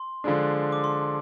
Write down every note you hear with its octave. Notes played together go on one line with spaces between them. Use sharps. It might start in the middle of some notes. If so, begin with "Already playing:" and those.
Already playing: C6
D3 F3 G#3 D4
D6
C6